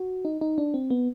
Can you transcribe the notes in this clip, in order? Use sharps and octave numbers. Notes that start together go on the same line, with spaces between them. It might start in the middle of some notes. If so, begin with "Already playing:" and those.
Already playing: F#4
D#4
D#4
D4
C4
B3